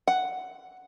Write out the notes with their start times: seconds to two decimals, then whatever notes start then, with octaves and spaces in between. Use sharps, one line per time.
0.08 F#5